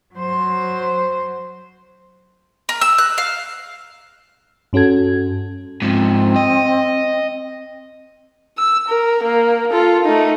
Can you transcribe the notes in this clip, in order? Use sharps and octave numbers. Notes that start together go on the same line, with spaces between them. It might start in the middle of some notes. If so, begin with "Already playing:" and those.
F#3 C5
A#4
E6
F#6
F5
G2 C#4 F#4 A4 G#6
G#2 F3 C4
D#5
E6
A#4
A#3
F4 A4
A3 D#4